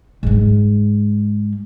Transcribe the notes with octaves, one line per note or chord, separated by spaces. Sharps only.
G#2 G#3